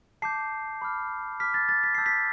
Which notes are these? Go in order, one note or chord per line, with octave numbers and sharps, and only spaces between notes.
A5 D6 G6 C7
B5 D6 F6
B5 D6 F6 B6
A6
A6
B6
A5 E6 G6 C7
B6